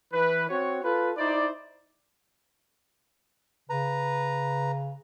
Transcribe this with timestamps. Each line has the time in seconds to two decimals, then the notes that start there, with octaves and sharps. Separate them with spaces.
0.12 E3 B4
0.49 C4 F#4 C#5
0.84 F4 A4 B4
1.18 D#4 E4 C5 D5
3.70 C#3 B4 A#5